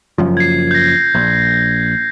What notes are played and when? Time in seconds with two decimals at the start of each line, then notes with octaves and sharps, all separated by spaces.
0.18 F#1 F#2 F3
0.37 G#6 C7
0.71 G6 A#6
1.15 A#1